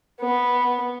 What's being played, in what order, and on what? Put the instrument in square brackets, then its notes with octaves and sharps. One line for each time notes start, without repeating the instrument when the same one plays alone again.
[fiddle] B3